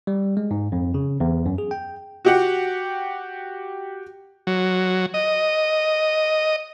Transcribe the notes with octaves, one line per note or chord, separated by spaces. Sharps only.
G3
G#3
G#2
F2
C#3
E2
F#2
G#4
G5
F#4 G4 F#5
F#3
D#5